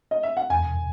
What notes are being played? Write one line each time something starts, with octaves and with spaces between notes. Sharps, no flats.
D#5
E5
F#5
E2 G#5